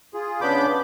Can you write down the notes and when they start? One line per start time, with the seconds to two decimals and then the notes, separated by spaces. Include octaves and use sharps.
0.14 F4 G#4
0.41 C#3 B3 D4 B5 D6 G6